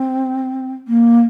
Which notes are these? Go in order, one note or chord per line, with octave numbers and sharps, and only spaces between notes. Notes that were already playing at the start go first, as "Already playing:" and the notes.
Already playing: C4
A#3